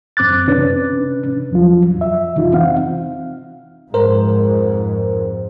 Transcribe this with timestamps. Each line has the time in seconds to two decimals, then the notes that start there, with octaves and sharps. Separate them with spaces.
0.17 F#2 C4 D6 F#6 A6
0.48 C3 C#4 D4 B4
1.51 E2 F3 F#3 F4
1.98 F2 E5
2.35 C3 E3 D#4 F4
2.53 C4 F5 F#5
3.94 F2 G#2 A#4 C5